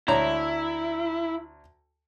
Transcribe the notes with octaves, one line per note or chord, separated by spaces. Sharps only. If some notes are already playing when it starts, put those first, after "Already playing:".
D2 E4 C#5 A#5